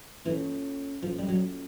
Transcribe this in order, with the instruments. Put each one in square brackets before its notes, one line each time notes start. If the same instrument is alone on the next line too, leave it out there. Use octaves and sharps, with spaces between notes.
[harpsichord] E3 [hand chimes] A#3 C#4 F4 A4 C#5
[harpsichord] F3 [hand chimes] A#3 C#4 F4 A4 C#5
[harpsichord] G3
F#3